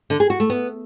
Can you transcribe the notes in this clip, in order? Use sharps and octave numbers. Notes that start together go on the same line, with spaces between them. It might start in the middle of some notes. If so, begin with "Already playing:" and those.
D3
G#4
F#4
A3
B3